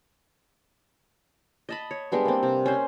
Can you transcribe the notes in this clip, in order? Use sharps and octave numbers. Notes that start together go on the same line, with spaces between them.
D#5 A5 B5
C#5
G3 G#3 B3 D4
A#3 C4
C3
C#4 C5